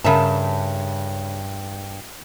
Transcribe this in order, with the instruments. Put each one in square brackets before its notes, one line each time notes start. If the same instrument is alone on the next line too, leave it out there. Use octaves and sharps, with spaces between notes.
[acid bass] G2 [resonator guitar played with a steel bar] C#3 A5 [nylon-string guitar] A#4 E5